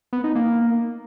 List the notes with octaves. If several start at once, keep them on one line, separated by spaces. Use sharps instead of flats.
B3
D#4
A#3